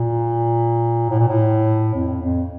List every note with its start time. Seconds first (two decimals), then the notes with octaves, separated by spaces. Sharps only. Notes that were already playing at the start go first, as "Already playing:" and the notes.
Already playing: A#2
1.10 A2
1.19 A#2
1.28 A2
1.94 F2
2.22 F2